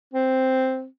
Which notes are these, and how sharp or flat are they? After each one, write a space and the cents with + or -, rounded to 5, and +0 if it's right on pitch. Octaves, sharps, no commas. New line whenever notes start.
C4 +0